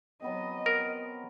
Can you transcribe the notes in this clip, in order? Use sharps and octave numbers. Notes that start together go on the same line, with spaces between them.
F#3 B3 C4 D#5
A#4